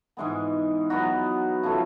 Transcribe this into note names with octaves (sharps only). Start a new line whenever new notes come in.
G#2 E3 G#3 B3
F#3 B3 D#4 F#4
C#3 F3 A3